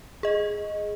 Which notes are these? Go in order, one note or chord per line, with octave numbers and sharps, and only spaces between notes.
G#4 D#5